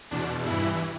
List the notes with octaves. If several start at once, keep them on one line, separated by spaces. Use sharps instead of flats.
E2 B2 D4
G2 E3 E4